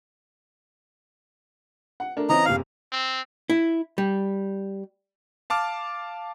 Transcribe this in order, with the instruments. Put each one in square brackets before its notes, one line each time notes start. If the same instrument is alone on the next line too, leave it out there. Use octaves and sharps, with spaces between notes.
[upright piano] F#5
A3 D4 A#4
[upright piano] E3 C4 C#4 [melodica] D#5 A#5
[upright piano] F#1 C3 F7 [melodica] F5
[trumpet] C4
[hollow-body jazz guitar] E4
G3
[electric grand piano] F5 A5 D6 F6